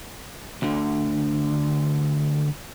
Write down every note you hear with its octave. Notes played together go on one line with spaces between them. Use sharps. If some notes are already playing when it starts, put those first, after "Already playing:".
D2 D3